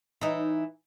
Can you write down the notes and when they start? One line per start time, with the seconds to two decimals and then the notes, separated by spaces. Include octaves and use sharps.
0.21 E3 D#4